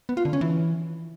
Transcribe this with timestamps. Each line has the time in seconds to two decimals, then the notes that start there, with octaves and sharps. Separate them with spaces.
0.09 B3
0.17 F4
0.25 D3
0.33 C#4
0.41 E3